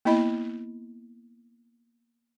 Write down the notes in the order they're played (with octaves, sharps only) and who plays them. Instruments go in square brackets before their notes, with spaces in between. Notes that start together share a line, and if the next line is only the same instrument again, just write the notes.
[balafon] A#3 B3 E4 D#5 B5